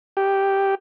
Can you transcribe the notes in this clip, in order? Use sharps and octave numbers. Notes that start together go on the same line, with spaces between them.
G4